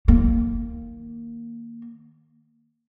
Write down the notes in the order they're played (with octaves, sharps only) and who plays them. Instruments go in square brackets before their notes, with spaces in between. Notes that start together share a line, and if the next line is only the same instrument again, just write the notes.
[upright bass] D#3 A#3